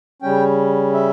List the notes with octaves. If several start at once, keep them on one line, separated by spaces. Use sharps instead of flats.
C#3 G3 C#4 G5
E5